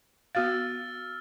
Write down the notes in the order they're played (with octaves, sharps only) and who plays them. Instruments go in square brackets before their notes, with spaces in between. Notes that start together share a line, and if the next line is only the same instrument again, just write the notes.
[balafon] B3 F#4 F5 [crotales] E6 F6 A6